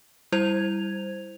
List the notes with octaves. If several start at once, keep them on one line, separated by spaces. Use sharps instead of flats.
G3 E4 C5 G#6 F7